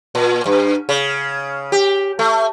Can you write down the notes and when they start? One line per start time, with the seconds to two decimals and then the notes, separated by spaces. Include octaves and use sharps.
0.15 A#2
0.46 G2
0.89 C#3
1.72 G4
2.19 A3